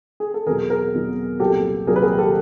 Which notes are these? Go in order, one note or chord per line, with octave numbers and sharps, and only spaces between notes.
G#4
A4
E2 B2 F#3 G#4 A#4
G#4 A#4
E2 B2 F#3
C2 A#2 F#3 G4 A4
C2 A#2 F#3 G#4 A#4
B4
G#4 A#4
G4 A4